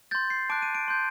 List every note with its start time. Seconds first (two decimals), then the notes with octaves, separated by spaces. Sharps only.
0.11 C6 G6 A6
0.30 C7
0.49 A5 D6 F#6 D7
0.62 D#7
0.75 D7
0.88 C6 G6